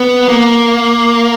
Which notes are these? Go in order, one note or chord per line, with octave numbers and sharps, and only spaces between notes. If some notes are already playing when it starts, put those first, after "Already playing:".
Already playing: B3
A#3